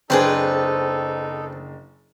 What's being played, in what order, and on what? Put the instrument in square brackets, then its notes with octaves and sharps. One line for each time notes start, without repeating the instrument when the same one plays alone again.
[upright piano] F#1 D4 [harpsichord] C4 [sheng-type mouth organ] D#4 A4 [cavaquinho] G#4 B4 G5